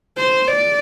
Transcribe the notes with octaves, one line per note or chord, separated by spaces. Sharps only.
C5
D5